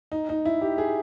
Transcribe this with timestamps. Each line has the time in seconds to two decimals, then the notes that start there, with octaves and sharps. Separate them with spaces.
0.12 D#4
0.29 D#4
0.45 E4
0.61 G4
0.78 G#4